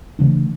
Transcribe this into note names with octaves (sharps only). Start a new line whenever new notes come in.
C#3 E3 A3 D4